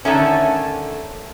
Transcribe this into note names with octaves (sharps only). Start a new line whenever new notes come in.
D3 D#3 A3 C#4